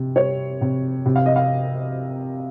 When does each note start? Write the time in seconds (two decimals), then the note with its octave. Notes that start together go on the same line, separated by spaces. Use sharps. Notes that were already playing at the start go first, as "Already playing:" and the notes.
Already playing: C3
0.16 G3 C#5
0.61 C3
1.06 C3
1.16 F5
1.26 D#5
1.36 F5